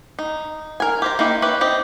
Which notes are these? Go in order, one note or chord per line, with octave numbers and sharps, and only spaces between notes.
D#4
A#4 G#5
G4 C5 A#5
A#3 D#4 E4 G4
G4 B4 C#5 E5
C4 G4 D#5